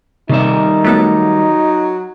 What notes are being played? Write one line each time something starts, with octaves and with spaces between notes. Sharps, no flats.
C3 D#3 G3 D#4 E5
F#3 A3 B3 A4